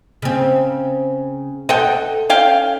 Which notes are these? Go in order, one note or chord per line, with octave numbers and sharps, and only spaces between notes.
C#3 C4
A4 D#5 F#5 G5
C#4 F5 G5